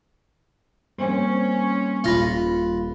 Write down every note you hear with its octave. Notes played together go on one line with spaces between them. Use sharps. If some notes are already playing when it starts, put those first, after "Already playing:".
G3 A#3 C4 C#4 C5
D#1 F4 B4 A#6